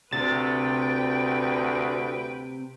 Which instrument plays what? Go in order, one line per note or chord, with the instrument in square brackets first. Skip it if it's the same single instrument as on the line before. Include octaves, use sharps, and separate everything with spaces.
[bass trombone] D2 [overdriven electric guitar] C3 [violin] B4 G5 [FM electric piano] A6